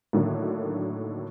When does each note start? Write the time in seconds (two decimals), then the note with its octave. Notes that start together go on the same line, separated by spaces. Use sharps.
0.13 A2 D3 D#3 F#3 A#3